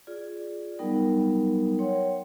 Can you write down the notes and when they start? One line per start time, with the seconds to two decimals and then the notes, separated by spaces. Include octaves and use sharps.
0.07 F4 G#4 D5
0.79 F#3 G3 B3 D#4 A#4 G5
1.79 C#5 F#5 G5 C6